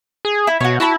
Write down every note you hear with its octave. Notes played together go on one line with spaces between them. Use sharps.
G#4
E4
B2 F#4 C#5
E4 F#4 A5 B5